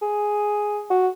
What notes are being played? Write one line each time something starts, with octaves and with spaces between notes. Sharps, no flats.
G#4
F#4